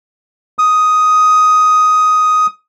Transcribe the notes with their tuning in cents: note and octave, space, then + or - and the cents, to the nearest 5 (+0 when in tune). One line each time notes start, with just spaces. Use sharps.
D#6 +10